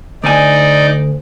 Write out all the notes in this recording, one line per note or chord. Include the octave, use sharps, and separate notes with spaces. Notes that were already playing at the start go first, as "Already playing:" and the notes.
D2 D#4 D5 G#5